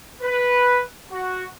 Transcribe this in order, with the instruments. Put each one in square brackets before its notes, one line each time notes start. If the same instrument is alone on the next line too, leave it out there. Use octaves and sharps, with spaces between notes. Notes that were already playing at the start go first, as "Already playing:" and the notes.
[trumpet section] B4
F#4